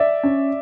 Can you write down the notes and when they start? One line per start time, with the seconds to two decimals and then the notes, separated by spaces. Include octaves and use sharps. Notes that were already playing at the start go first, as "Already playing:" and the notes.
Already playing: D5 E5
0.23 C#4